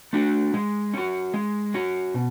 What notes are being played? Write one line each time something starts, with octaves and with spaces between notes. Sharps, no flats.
A3 D4 F#4
G#3
C#4 F#4
G#3
C#4 F#4
B2